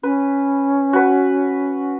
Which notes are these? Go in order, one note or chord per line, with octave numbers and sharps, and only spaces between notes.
C#4 B4
F#4 B4